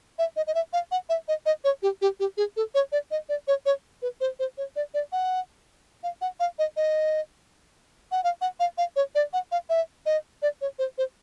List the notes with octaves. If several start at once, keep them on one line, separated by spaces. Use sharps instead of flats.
E5
D#5
D#5
E5
F5
F#5
E5
D#5
D#5
C#5
G4
G4
G4
G#4
A4
C#5
D5
D#5
D5
C#5
C#5
B4
C5
C5
C#5
D5
D5
F#5
F5
F#5
F5
D#5
D#5
F#5
F5
F#5
F5
F5
C#5
D5
F#5
F5
E5
D#5
D5
C#5
C5
C5